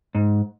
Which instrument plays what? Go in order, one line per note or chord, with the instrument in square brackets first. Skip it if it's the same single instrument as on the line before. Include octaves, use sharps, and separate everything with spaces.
[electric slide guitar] G#2